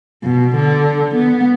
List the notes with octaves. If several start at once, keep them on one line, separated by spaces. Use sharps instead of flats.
B2
D3
B3